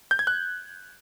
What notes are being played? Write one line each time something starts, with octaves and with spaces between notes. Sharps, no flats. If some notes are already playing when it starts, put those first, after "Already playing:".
G6
G#6
F#6